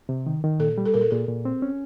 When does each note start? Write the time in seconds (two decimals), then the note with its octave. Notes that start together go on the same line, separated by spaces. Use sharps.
0.09 C3
0.26 D#3
0.44 D#3
0.60 A#2 A4
0.78 G3
0.86 A4
0.94 A#2 A#4
1.01 A4
1.11 A#2 G#4
1.28 A#2
1.45 C4
1.62 C#4